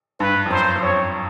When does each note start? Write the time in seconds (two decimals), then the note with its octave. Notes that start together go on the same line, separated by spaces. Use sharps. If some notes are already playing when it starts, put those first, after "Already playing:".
0.20 G2 B4
0.46 F2
0.50 F#2 C5
0.75 F#2
0.82 F2 C#5